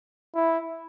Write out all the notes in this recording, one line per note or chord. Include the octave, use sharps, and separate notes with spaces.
E4